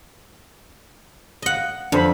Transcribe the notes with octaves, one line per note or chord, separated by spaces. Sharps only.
D#5 F#5
F2 D4 C5 B5